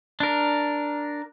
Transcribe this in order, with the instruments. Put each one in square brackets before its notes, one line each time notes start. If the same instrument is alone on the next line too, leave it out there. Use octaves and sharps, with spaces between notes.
[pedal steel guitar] D4 A#4